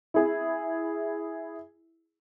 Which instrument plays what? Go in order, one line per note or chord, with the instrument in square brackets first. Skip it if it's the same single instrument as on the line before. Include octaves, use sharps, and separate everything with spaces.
[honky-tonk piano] E4 G#4